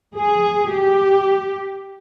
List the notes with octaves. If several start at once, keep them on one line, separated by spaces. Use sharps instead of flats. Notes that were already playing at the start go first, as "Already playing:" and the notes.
G#4
G4